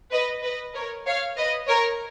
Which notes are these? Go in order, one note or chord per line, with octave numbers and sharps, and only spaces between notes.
B4 D#5
B4 D#5
A#4 C#5
C#5 F5
B4 D#5
A#4 C#5